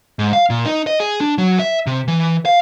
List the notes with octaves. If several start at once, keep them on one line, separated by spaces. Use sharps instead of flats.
G#2
F5
A#2
D#4
D#5
G#4
D4
F#3
E5
C3
E3
F5